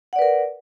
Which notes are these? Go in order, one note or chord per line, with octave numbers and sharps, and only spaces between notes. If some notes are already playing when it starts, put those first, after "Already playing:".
A#4 B4 D5 F#5